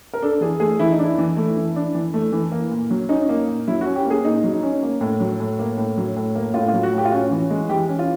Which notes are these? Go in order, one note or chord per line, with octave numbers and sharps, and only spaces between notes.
A#4
D4 A4
E3 G#4
A3 G#4
E3 E4
D#4
D4 E4
E3
A3
E3
D4
E3
A3
E3
A#3
A#2
F#3
C#4 D#4
A#3
A#2
F#3 E4
C#4 F#4
G4
A#3
G#4
A#2 D#4
F#3
D#4
C#4
A#3
A2
F#3
A2
A#3
A2
F#3
A2
A#3
A2 F4
F4
F#3
F#4
A2
G4
F4
C#4 F#4
E3
G#3
E3 G4
C#4
F4